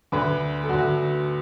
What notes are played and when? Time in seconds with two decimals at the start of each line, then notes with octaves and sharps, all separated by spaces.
0.12 D2 D3 B4
0.64 A4
0.69 D2 D3 F#4